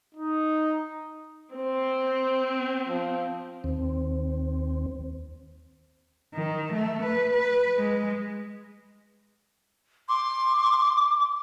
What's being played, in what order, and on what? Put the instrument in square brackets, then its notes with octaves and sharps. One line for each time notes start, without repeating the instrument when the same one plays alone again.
[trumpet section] D#4
[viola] C4 [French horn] C5
[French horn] F3
[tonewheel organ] D#2 C4
[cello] D#3
A3
B4
B4
G#3
[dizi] C6 [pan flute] D6